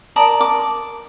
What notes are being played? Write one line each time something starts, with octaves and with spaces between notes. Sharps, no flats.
A#4 D5 A5 D#6
D6